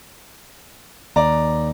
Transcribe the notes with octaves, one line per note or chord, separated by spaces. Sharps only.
D#2 D5 A#5